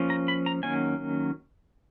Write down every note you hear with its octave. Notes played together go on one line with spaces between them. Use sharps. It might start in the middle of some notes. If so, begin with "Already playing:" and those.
Already playing: F3 A#3 C#4
A#5
B5
A#5
D#3 F#3 A#3 C#4 G#5